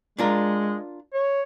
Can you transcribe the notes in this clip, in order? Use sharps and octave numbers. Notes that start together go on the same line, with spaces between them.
G#3 D4 F4 A#4
C#5